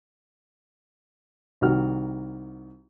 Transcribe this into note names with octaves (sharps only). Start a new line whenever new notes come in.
C2 D#3 F#4 F6